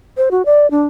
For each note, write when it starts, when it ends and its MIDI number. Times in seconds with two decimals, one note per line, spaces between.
0.17 0.29 72
0.31 0.42 66
0.46 0.69 74
0.71 0.86 62